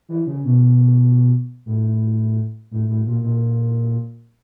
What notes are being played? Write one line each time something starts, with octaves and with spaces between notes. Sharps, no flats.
E3
C#3
B2
A2
A2
A2
A#2
A#2